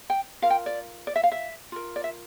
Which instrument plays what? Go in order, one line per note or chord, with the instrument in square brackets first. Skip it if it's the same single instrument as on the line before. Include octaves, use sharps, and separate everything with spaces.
[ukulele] G5
F4 A#4 F5
G5
D5
D5
E5
F5
E5
F4 A#4
D5
E5